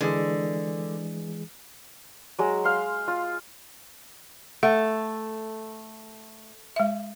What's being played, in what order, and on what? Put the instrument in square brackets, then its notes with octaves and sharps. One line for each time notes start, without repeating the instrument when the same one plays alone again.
[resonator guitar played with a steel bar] D3 [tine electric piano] E3 G#3 G#4
[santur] F#3 G#3
F5 C6
F4
[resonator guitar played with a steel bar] A3 [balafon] F#5
[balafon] G#3 E5